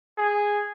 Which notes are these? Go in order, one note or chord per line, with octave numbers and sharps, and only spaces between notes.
G#4